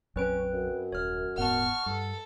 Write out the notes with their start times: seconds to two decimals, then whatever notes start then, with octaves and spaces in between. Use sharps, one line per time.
0.16 A#1 F2 F#3 C4 C#4 B4 D7
0.53 F#2
0.92 D#1 C#5 F6
1.38 D#1 G#2 B3 F#5 A5 C#6 F6
1.86 G2 A4